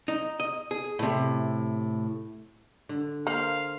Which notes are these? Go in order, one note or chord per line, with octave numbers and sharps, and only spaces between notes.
D#4
D#5
G#4
A2 C3
D3
A#3 C5 F5